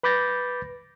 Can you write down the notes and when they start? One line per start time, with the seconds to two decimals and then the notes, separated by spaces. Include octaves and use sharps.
0.03 B4 B5 D6 G6 A6 A#6